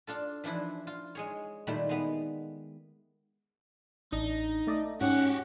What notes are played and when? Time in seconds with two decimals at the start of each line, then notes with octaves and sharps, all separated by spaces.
0.07 D4 F4 A4
0.44 E3 F3 D4 E4
0.87 F4
1.15 G#3 G#4 C#5
1.67 A#2 D#3 G3 A3 E4
1.89 G#3 B3
4.12 A1 D4 D#4 D#5
4.67 A3 D5 D#5
5.01 G#2 C#4 F#4 G4 F#5